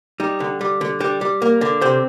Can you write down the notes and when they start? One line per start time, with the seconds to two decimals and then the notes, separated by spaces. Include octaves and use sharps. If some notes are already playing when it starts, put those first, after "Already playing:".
0.20 G3 D#4
0.40 D3
0.61 G3
0.81 D3
1.00 G3 D4
1.21 G3
1.42 A#3
1.61 D3
1.81 C3 C4